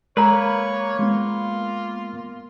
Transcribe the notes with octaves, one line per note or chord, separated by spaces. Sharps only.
G#3 A#3 A#4 B4 C#5 A#5
G#3 B3 F4